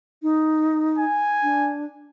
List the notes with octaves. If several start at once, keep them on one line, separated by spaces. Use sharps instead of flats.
D#4
G#5
D4